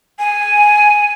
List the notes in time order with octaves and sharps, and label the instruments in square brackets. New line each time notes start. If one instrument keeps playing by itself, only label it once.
[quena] G#5